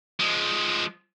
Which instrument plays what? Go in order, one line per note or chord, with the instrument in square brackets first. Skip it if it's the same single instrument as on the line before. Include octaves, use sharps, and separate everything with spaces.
[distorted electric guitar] F3 G#3